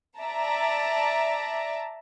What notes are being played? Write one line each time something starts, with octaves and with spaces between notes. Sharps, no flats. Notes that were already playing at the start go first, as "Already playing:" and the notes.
D5 E5 A5 A#5